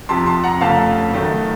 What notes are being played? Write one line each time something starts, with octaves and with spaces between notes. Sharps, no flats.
F2 C3 F3 A5 C6
A5 C6
F#5 A#5
F1 F2 C#3 A3 F5 A5
F#2 D#3 A3